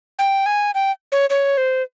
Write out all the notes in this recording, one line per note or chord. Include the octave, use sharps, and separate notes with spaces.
G5
G#5
G5
C#5
C#5
C5